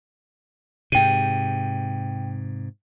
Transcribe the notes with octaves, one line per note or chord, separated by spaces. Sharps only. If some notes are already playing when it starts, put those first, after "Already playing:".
G#2 C3 G5 D#7